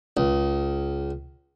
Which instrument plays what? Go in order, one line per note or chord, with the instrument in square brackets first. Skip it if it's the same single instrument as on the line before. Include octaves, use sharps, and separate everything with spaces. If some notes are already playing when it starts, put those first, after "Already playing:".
[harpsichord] C#2